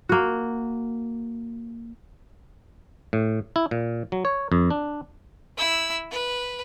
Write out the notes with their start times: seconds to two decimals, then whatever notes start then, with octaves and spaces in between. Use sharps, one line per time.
0.09 A#3 F#4
3.13 A2
3.56 E4
3.71 A#2
4.12 F#3
4.25 C#5
4.52 F2
4.70 D4
5.58 E4 E6
6.11 B4